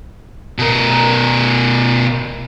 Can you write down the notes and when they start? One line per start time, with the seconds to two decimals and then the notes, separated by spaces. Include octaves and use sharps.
0.58 B2 A#4